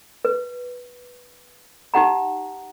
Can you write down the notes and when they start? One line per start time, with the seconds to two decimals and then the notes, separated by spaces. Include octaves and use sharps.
0.25 B4
1.94 D#4 G4 F#5 A#5